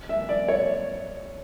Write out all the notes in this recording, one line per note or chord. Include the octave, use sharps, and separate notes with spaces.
E5
D5
C#5